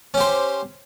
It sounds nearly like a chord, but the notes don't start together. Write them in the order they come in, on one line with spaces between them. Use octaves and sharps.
C#4 G4 C5